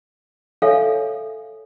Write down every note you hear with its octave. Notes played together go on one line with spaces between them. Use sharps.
A4 C#5 E5 F5 G#5